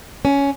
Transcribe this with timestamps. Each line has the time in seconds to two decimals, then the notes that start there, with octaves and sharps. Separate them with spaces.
0.25 C#4